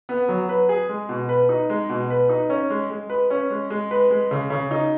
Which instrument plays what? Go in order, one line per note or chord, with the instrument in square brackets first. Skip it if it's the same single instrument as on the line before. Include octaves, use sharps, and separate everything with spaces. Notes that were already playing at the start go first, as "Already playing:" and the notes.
[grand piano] B3
F#3
B4
G#4
G#3
B2
B4
D#4
G#3
B2
B4
D#4
C#4
G#3
G#3
B4
C#4
G#3
G#3
B4
G#3
C#3
C#3
D#4